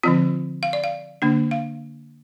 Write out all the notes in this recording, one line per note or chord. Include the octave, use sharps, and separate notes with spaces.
D3 F3 C4 F4
F5
D5
F5
D3 A#3 D4
F5